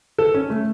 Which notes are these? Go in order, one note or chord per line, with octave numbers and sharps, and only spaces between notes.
A4
C#4
A3